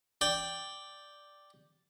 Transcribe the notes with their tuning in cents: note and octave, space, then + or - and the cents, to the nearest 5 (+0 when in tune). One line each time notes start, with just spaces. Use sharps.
D5 +0 G5 +0